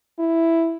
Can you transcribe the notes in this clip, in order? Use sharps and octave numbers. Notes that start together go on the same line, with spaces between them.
E4